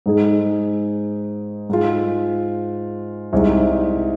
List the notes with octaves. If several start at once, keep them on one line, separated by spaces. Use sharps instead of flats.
G#2 G#3 D#4 G#4
G#2 G#3 F4
C2 C3 G#3 D#4